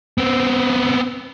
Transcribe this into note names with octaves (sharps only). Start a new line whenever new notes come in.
B3 C4